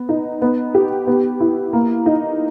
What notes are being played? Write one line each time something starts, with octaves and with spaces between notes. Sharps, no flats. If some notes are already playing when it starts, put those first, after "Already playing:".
Already playing: B3
D#4
B3
G4
B3
E4
A#3
D#4